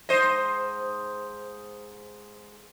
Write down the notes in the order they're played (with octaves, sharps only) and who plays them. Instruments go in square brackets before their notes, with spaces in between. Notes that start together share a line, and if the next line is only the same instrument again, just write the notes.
[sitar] G#2 C5 D#5